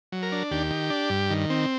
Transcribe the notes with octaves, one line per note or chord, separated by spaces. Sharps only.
F#3
A#4
D4
D#2 G4
D#3
D4
G2
D#3
C4